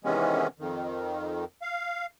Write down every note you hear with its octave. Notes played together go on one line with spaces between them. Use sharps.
C3 D#3 E3 G#3 B3 C#4
F2 D#3
F5